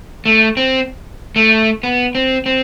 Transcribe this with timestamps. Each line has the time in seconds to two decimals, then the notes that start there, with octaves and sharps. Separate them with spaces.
0.26 A3
0.57 C4
1.36 A3
1.83 B3
2.15 C4
2.46 C4